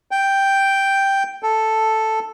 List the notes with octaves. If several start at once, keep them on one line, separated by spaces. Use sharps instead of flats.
G5
A4